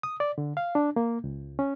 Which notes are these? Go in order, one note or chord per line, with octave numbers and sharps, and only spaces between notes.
D#6
D5
D3
F5
D4
A#3
C#2
C#4